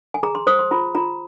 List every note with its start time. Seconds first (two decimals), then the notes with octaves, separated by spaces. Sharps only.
0.14 G#5
0.23 G#4 A#5
0.35 C6
0.47 C5 D#6
0.59 C6
0.71 F4 A#5
0.95 F4 A#5